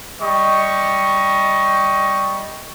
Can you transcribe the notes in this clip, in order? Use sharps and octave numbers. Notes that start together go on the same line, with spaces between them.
G3 D#5 C#6